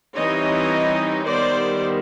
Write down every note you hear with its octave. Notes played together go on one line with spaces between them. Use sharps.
E3 G3 C4 D#4 C#5 D#5
D#3 G3 B3 C5 D5